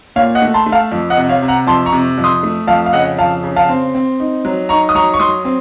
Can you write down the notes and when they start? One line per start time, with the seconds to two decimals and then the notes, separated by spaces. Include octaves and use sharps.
0.16 A#2 C#5 F5
0.35 D#5 F#5
0.42 A3
0.54 A5 C6
0.66 A3
0.72 F5 A5
0.92 F2
1.10 D#5 F#5
1.17 C3
1.29 C#5 F5
1.42 C3
1.48 F#5 A#5
1.67 F2 A5 C6
1.86 A#5 C#6
1.92 C3
2.18 F2
2.24 C6 D#6
2.43 A3
2.67 F2 F5 A5
2.86 F5
2.93 C#3 D#5 F#5
3.19 F2 F5 A5
3.43 C#3
3.56 F5 A5
3.69 C4
3.95 C4
4.20 D#4
4.45 F#3
4.69 D#4 A#5 C#6
4.89 D#6
4.95 F#3 A#5 C#6
5.14 C#6
5.20 F#3 C6 D#6
5.45 C4